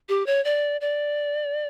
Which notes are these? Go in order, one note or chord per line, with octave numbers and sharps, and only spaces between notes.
G4
C#5
D5
D5